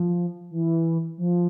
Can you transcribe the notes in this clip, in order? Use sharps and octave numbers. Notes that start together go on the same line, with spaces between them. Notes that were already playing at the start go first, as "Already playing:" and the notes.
Already playing: F3
E3
F3